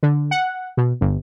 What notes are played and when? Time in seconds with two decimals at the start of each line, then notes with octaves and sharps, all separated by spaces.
0.03 D3
0.31 F#5
0.77 B2
1.01 G1